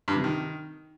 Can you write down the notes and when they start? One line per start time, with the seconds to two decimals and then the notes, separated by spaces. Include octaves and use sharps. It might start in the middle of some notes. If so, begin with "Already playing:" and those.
0.08 G2
0.16 C3
0.24 D#3